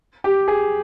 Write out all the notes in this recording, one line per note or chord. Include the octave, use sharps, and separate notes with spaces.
G4
G#4